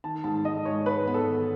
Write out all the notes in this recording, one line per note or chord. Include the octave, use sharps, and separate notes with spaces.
D#3 A5
G#2 A5
G#2 D#5
G#3 C#5
G#2 B4
B3
A4
D#3